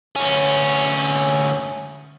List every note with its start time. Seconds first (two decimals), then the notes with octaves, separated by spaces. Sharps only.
0.16 D2 C#4